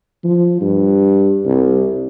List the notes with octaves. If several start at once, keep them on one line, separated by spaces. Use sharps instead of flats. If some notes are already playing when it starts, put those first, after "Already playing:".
F3
G2
C2